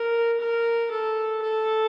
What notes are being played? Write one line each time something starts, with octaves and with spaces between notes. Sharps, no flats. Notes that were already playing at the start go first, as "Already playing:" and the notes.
Already playing: A#4
A#4
A4
A4